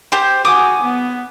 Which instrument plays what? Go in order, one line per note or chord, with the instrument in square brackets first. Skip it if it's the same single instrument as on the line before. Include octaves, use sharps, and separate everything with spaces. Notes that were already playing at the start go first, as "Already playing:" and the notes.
[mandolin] G4 C5
[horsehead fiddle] F#4 G#5 [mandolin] D6 D#6
[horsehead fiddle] B3